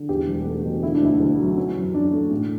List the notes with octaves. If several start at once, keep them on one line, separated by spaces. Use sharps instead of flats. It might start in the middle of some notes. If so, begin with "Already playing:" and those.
Already playing: D3
E2 G4
E1
A3
B2
D3 E4
D4
D2 E4
D2
F#3
E3 C#4
F#2
F#2 D4
A3
A2